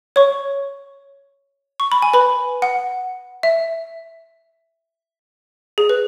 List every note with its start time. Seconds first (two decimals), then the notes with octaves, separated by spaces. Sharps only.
0.16 C#5 C#6
1.80 C#6
1.92 B5
2.02 G#5
2.14 B4 B5
2.62 F#5
3.43 E5
5.78 G#4
5.89 B4